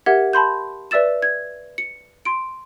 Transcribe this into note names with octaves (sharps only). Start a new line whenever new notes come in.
G4 A#4 E5 F#5 G#6
A5 B5 C6 G6
B4 D5 E5 E6 A6 E7
G#6
C#7
C6 D7